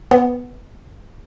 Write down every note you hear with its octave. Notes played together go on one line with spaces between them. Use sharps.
B3